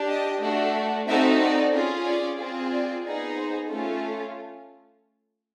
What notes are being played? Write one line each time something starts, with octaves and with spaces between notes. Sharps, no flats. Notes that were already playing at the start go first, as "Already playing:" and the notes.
Already playing: D4 G4
D#5
A3 D4 F#4
C4 D#4 F#4 A4 E5
D5
C#4 F4 G#4
D5
C4 F4 G#4
D5
B3 D#4 G#4
C5
A3 C#4 F4 A4